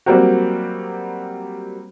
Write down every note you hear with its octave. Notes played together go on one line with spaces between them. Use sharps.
F#3 G3 A#3 C4 F#4